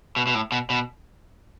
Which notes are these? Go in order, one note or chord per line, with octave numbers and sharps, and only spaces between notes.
B2
B2
A2
B2
B2